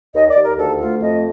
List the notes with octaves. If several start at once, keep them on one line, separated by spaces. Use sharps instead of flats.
D#2 D#5
D5
D#2
A#4
D2 A4
A3 F4
F2 D#5